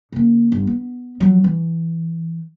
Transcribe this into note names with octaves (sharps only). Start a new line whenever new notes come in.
C#3 A#3
G1
B3
F3 F#3
E3